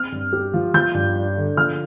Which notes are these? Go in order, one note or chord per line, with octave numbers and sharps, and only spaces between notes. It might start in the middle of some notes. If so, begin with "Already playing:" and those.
Already playing: C4 F6
G2
G4
F3
F3 G6
G2
D4
D3
F3 F6